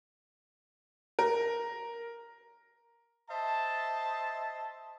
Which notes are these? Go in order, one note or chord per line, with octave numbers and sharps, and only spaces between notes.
A#4
C5 D#5 E5 A5